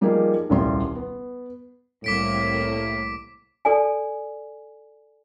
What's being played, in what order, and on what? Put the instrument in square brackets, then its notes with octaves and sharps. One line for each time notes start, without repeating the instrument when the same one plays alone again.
[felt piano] F3 G3 A#3 D#4 G#4
D#1 C2 G3 C6
B3
[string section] C2 A#3 [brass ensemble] A2 [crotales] D6 B6 D7
[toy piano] A4 D5 G#5